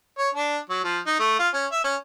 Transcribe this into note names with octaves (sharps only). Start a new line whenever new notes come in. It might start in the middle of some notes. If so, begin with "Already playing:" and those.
C#5
D4
F#3
F3
D#4
A3
F4
C#4
E5
C#4